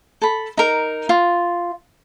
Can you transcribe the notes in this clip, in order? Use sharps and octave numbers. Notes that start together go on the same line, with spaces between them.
A4 B5
D#4 A#4
F4